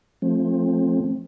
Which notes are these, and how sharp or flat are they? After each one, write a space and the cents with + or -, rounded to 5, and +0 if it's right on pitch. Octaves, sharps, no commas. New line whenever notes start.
F3 +0 A3 +0 C4 +25